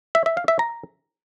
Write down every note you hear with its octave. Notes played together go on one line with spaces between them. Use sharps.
E5
E5
F5
E5
A#5